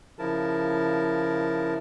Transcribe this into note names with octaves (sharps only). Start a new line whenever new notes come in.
C#3 F3 E4 A#4 A5